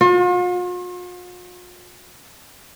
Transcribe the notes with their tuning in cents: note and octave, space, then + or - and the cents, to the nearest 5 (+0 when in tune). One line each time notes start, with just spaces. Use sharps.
F4 +45